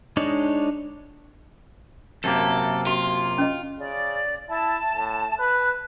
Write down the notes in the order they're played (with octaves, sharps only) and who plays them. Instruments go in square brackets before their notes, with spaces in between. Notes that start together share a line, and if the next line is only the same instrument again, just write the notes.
[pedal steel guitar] G#3 D4 D#4 C#5
[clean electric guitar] F#2 C3 A#3 [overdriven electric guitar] A4
[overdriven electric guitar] F4 [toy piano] F#4
[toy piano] C#4 D#5
[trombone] C#3 [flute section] D5
[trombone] E4 [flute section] A5
[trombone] A2
[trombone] B4 [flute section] F#6